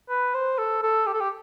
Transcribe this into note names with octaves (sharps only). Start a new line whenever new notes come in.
B4
C5
A4
A4
G4
A4
G4